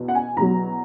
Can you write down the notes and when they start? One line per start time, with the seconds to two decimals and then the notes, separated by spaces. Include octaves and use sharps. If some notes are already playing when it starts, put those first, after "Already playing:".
Already playing: E2 B2
0.08 F#5
0.15 G#5
0.37 E2 B2 F#3 A#5